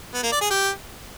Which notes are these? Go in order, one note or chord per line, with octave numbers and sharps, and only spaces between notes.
B3
A#3
D5
G#4
G4